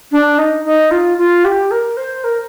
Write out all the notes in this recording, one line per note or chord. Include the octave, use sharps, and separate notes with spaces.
D4
D#4
D#4
F4
F4
G4
A#4
C5
A#4